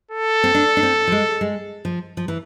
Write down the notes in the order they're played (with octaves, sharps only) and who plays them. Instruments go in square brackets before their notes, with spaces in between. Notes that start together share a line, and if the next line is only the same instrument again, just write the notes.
[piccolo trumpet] A4
[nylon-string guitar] C4
D4
D4
C4
F3
G#3
G#3
F3
F3
E3